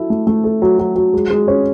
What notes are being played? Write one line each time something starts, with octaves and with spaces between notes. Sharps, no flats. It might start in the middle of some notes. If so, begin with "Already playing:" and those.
Already playing: F#3 E4 A4
A3
A3
A4
F#3
F#3
F#3
G#3
G#3
C#4